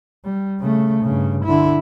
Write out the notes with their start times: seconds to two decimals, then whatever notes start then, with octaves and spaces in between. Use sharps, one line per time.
0.25 G3
0.60 C#3 A3
1.03 G2 C#3
1.45 D3 E4